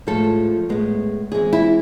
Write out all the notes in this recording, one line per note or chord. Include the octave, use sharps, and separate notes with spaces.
A2 F3 G#3 A4
A2 G#3 B3
E3 G#3 C4 G#4
E4